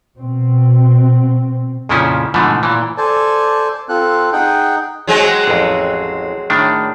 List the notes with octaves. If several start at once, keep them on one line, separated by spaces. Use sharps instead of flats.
B2 C4
F2 A#2 C#3 F3 C#4 E4
G#2 B2 D3 E3 F3 A3
A#2 E3
A4 C5 D5 G#5 A5
C4 F4 A4 F#6
D#4 G#4 F#5 G5
F#3 G#3 C4
A1 F2
A2 D#3 D4